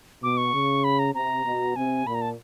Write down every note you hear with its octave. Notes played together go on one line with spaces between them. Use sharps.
B2 D6
C#6
C#3
B5
A#5
C3 A#5
B2
C3 G#5
A#2 B5
A#5
A5